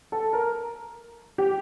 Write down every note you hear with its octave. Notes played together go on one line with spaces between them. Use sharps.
A4
A#4
G4